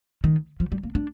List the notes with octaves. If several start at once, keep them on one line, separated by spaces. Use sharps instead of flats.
D#3
F3
G3
A#3
D4